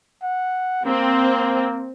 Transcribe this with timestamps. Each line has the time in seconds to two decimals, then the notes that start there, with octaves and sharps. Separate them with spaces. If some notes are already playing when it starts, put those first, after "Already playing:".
0.23 F#5
0.85 A#3 C4